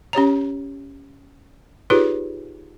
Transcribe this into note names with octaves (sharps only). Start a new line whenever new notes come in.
C#4 G4 C#5 A#5
D#4 F4 G4 G#4 B4 C#5